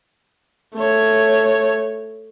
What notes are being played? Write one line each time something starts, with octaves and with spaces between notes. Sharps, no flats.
A3 C#5